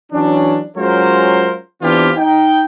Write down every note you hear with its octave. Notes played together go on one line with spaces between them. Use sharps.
E3 F#3 C#4 D4
F#3 G#3 C#4 F4 A#4 C5
E3 B3 C4 D4 F4 G4
D#4 G5